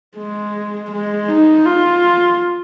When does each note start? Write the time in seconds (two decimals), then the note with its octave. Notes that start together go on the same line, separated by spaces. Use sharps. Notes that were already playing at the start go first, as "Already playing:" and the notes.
0.17 G#3
0.92 G#3
1.28 D#4
1.65 F4